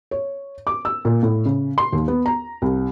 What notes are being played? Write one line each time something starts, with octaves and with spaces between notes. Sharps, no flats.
C#5
D6
E6
A#2
A2
C#3
C6
D#2
B3
A#5
C2